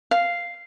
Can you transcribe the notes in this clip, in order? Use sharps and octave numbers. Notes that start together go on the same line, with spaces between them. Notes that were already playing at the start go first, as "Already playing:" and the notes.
F5